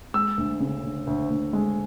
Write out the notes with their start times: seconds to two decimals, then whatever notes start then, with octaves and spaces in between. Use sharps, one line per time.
0.14 G#3 E6
0.38 D2
0.60 C#3
0.84 D2
1.07 D2
1.30 D2
1.53 G#3